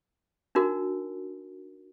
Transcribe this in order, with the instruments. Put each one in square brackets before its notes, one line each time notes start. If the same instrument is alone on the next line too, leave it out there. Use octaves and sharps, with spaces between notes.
[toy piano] D4 D#4 F#4 A#4